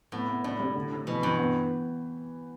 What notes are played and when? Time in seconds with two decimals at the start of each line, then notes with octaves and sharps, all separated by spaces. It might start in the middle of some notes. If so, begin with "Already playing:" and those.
0.12 A2 B3
0.28 B3
0.44 A2 D4
0.60 G3
0.75 D3
0.92 D3
1.07 B2 E3
1.23 G2 E3
1.38 B3